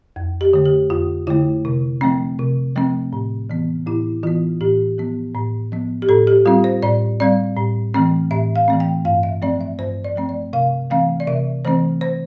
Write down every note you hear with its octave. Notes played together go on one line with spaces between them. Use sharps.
F2
G4
D3 A3
G4
F2 F4
D3 A3 E4
C3
F3 A3 C4
C3
F3 A3 C4
A2
E3 B3
A2 E4
E3 B3 F4
A2 G4
F3 B3
A2
F3 B3
G4
A2 A4
G4
G3 C4 F4
C5
A2 D5
G3 C4 D5
A2
E3 A3 C4
A2 E5
F5
E3 A3 C4
G5
G2 F5
E5
F3 A3 C4 D5
E5
G2 C5
D5
F3 A3 C4
D5
C3 F5
E3 A3 C4 F5
D5
C3 E5
E3 A3 C4 C5
C5